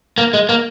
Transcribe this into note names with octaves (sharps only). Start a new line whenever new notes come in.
A#3
G#3
A#3